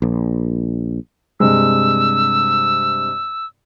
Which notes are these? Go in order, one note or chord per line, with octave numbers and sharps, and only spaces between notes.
A#1
G2 C3 G#3 E6